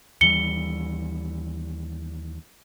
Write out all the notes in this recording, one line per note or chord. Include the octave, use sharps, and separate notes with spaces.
D#2 E3 G3 C#7 G7